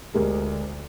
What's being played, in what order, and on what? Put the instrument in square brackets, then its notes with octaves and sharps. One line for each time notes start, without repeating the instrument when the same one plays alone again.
[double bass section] D2 [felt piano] G#3 G4 A#4